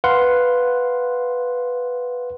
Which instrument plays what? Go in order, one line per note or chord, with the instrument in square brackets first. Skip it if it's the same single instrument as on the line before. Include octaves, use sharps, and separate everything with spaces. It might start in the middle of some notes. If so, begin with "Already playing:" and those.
[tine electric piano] B4 F5 F#5 C6